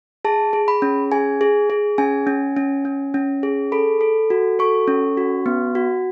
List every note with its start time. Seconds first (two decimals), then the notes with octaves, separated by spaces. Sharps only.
0.25 G#4 A5
0.53 G#4
0.68 B5
0.82 C#4
1.12 G#4 G#5
1.41 G#4
1.70 G#4
1.98 C#4 G#5
2.27 C#4
2.57 C#4
2.85 C#4
3.14 C#4
3.43 G#4
3.72 A4 B5
4.01 A4
4.30 F#4
4.59 A4 C#6
4.88 C#4
5.17 F#4
5.46 B3
5.75 F#4